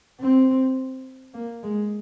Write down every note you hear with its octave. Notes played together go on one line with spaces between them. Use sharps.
C4
A#3
G#3